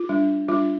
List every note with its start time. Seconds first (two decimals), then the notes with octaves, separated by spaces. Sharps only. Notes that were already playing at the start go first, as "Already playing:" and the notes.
Already playing: F4
0.09 G3 D4
0.48 G3 D4 F4